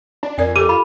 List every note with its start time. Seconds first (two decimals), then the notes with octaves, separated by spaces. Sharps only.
0.23 D4
0.38 F2 A#4 D5 G#5
0.56 G4 A4 D6 D#7
0.69 F4 B5